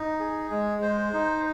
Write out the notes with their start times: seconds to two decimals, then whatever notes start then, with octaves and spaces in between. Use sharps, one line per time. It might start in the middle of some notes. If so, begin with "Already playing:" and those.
Already playing: D#4
0.20 G#4
0.50 G#3
0.82 C5
1.13 D#4